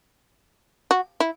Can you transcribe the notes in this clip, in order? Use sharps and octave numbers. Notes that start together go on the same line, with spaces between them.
F#4
E4